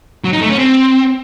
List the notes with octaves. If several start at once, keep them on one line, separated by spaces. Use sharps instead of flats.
F#3
D#4
A3
C#4
C4